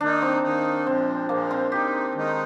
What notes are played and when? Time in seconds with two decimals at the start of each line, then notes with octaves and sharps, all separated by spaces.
0.01 D#3 A#3 D4 D#4
0.22 C4
0.43 D#3 A#3 D#4
0.86 A#2 F3 G#3 C4
1.29 A#2 F3 G#3 A#3
1.51 C4
1.72 D#3 G#3 D#4 G4
2.14 D#3 G#3 D#4